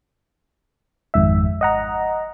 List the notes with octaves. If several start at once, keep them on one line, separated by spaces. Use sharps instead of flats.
G#1 F2 G#2 E5
D#5 F#5 A#5